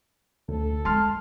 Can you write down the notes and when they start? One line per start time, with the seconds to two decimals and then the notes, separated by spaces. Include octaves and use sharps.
0.49 D2 A4
0.85 G#3 A5 C6 F6